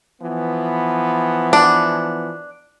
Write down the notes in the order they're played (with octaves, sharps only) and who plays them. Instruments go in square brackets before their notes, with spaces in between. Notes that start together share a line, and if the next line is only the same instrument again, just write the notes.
[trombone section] E3 F3 B3
[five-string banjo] D4